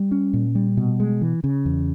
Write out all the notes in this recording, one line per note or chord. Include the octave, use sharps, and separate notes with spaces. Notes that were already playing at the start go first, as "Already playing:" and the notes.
Already playing: G3
C#4
A#2
G3
B2
G#3
E3
C#3
E2